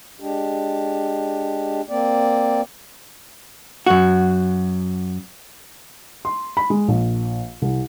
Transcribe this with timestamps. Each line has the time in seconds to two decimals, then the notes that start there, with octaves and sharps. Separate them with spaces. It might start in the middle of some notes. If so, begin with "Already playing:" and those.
0.20 G#3 D4 G4
1.89 A#3 C4 D5
3.87 F#2 F#4
6.25 C6
6.57 B5
6.70 G#3
6.88 A#1
7.62 C2